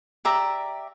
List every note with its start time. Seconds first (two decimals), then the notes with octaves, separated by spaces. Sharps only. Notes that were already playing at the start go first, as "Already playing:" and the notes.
0.25 G4 D5 E5 A#5